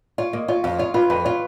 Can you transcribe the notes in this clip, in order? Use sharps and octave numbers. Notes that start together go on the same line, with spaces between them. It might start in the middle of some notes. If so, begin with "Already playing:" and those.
F4 C#5
A#3 D#5
F4 C#5
F2 F5
F4 C#5
F4 B4
F2 B4
F4 C#5